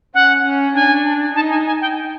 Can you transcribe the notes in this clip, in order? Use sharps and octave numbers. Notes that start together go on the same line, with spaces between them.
C#4 F#5
C#4
D4 G#5
D#4 A5
G#5
G#5
G5